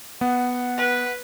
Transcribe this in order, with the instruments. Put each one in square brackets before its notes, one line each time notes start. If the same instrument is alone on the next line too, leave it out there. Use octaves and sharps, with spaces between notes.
[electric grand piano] B3 [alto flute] F#5
[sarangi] B4